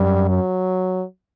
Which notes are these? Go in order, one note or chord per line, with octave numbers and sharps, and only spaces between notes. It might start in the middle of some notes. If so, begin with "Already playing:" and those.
Already playing: F#2 G3
F#3